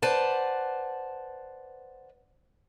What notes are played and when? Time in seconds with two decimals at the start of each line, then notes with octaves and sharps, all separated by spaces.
0.02 B4 C5 D5 F#5 A5